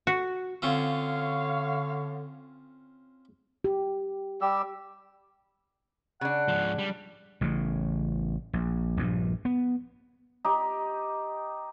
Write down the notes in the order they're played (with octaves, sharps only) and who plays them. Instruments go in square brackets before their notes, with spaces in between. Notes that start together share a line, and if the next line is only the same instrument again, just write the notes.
[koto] F#4
[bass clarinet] D3 [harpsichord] C4 C#4 F4 [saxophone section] C#5 F5
[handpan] G4
[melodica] G3 G4 E6
[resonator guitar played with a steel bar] C#3 D4 [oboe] F#5
[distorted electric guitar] G#2 F3
G3
[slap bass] A1 C#3
A#1
A#1 G2
B3
[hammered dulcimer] D#4 G4